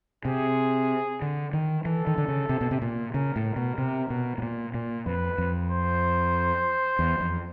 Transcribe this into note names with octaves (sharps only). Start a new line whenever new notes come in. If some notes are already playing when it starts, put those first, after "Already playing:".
C3 G#4
D3
D#3
E3 A4
D#3
D3
C#3
C3
B2
C3
A#2
C#3 A#4
A2
A#4
B2
C3
B2
A2
A#2
A#2
F2 B4
F2
C5
E2
F2